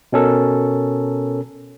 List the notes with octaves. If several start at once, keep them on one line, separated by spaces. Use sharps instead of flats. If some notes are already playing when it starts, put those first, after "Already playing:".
B2 C#4 A4 A#4